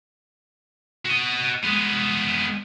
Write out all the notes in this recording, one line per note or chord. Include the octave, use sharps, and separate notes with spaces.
F#4 D#5
G#3 B3